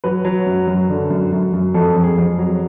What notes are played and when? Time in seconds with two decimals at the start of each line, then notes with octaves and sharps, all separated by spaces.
0.04 F#3 B4
0.25 F#3
0.47 F#2
0.68 F#2
0.89 D3
1.10 F#2
1.33 F#2
1.53 F#2
1.74 F2 A4
1.96 F2
2.03 G#4
2.18 F2
2.39 F#3